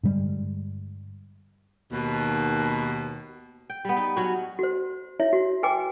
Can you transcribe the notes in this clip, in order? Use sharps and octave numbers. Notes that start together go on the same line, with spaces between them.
G2 D3 G3 G#3
D#2 B2
G5
G3 B3
D#4
F#3 C#4 F#4
F#4 C5
E4 C#5 E5
F#4
F#4 B4 G5 G#5 D6